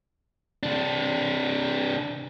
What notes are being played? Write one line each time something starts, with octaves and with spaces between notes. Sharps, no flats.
C3 D4